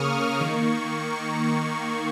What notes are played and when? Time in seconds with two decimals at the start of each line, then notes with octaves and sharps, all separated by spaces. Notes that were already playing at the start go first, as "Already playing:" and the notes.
Already playing: C#3 A#3 C#6 D#6 F6
0.41 D#3 A#3